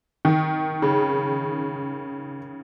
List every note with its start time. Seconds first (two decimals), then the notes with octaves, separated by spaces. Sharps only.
0.25 D#3
0.82 C#3